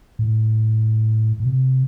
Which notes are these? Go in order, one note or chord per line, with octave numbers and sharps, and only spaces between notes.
A2
A2
C3